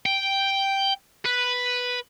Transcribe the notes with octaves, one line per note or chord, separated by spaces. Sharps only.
G5
B4